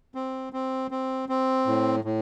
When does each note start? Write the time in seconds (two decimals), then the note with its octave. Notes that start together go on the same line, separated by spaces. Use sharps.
0.15 C4
0.53 C4
0.91 C4
1.29 C4
1.67 A2
2.04 A2